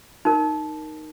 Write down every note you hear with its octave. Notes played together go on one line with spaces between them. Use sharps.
D#4 A#4